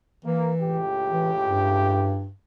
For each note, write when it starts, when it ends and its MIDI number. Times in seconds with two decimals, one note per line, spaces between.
0.25 0.80 52
0.25 0.51 58
0.62 2.27 37
0.62 2.27 45
0.62 2.27 67
1.10 1.32 52
1.45 2.32 43